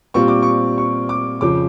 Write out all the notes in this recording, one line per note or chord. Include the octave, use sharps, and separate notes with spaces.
A#2 G3 C4 F4 C#6
D6
C#6
C#6
D6
F2 C#3 F3 D6